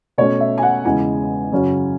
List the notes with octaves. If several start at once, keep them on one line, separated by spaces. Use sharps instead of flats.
B2 A3 C#4 C#5
E5
G#5
F#5
E2 C#3 G#3 G#5
F#2 C#3 F#3 C#4